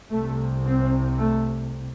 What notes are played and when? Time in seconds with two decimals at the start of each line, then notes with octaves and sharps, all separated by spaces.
0.11 C2 C3 A3
0.65 C4
1.18 A3